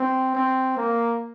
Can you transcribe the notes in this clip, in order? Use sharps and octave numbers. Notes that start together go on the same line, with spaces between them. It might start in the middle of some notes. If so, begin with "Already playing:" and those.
Already playing: C4
C4
A#3